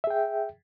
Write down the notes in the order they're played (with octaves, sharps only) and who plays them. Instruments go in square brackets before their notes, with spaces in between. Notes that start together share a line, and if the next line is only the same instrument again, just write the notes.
[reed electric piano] E5
G#4
G5